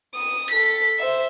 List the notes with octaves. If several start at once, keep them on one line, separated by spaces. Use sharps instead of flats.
D#6
A4 B6
C5 E5